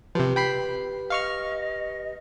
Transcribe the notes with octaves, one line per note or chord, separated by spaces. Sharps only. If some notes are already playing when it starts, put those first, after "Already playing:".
C3 F3 G4 B4
G5 B5 C7
D#5 F5 C#6 F6